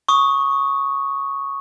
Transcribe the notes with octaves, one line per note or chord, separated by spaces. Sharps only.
C#6 D#6